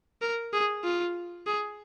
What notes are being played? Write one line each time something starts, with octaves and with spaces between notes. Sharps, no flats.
A#4
G#4
F4
G#4